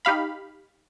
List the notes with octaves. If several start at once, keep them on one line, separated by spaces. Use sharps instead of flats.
D#4 G4 F5 B5